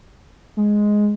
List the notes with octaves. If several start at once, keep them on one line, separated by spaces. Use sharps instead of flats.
G#3